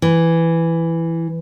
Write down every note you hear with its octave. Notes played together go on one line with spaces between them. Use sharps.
E3